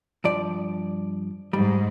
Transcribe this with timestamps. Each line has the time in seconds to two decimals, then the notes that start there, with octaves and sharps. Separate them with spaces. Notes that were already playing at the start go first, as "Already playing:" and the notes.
0.24 G2 F3 D5
1.53 G#2 G3